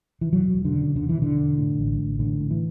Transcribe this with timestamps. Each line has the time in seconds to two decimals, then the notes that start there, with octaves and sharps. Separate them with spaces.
0.21 E3
0.33 E1 F#3
0.55 E1
0.65 D3
0.74 C#3
0.95 E2 D3
1.09 E3
1.16 E1
1.22 D3
1.36 E1
1.58 A2
1.78 A1
1.99 A1
2.19 A2 D3
2.41 A2
2.50 E3